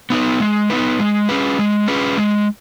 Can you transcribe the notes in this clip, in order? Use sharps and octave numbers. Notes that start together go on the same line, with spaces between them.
B3 D#4 B4
G#3
B3 D#4 B4
G#3
C#4 G#4 B4
G#3
C#4 G#4 B4
G#3